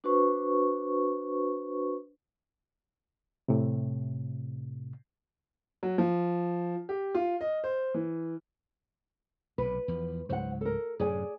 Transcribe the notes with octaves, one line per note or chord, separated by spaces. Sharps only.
D4 F#4 B4 C5 C#6
A2 C3
F#3
F3
G4
F4
D#5
C5
E3
B1 C3 B4
E2 F3
C#2 G#2 F#3 C5 F#5
A4 A#4
F#2 A2 C3 G#4 D5 G#5